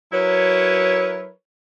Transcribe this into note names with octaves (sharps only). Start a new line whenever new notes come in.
F#3 E4 A#4 B4 C#5